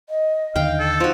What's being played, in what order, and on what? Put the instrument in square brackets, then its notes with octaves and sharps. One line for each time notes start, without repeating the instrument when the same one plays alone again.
[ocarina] D#5
[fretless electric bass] D#2 D3 D#3 [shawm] F5 [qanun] G5
[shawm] A4
[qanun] F3 F#4 [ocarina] D#4